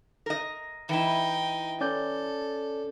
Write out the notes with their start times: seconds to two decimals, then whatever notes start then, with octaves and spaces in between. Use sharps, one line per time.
0.26 A#4 D#5
0.89 E3 D#4 E4 G5
1.81 C#4 A4 D5 G6